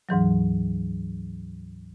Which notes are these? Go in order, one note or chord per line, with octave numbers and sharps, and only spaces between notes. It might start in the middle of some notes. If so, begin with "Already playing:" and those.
D2 G#2 E3 F#3